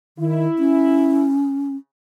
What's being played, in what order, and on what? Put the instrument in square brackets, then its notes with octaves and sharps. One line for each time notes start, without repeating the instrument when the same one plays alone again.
[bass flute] D#3 [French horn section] E4
[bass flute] C#4